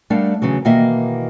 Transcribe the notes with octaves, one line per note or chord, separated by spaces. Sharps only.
G3 A3 D4 A#4 F5 F#5
E2 C#3 E3 F#3
B2 D#3 E3 A#3 D#5 E5